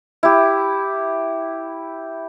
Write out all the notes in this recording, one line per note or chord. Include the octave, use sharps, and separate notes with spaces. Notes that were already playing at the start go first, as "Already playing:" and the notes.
E4 G4